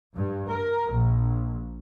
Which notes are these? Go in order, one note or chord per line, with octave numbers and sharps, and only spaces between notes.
G2
A#4
A#1